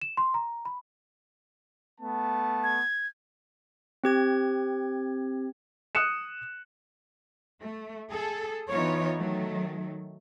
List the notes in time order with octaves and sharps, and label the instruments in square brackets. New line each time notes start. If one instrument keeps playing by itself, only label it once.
[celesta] E7
C6
A#5
B5
[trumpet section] A3 B3 A5
[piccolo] G#6
[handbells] C4 G4 G#6
[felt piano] D#6 F#6 C#7 E7
[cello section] A3
G#4 A4
E3 B3 D#4 F4 C#5
D#3 F#3 A3